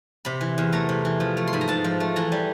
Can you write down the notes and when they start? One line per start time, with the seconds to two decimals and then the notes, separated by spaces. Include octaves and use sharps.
0.25 C3 B5
0.41 E3
0.58 E2
0.73 A3 A#5
0.89 C3
1.05 E3
1.20 F3
1.37 A3
1.47 C6
1.53 G#2 B5
1.61 A#5
1.68 G#2 A5
1.84 F3
2.00 A3
2.16 E3 A#5
2.32 G3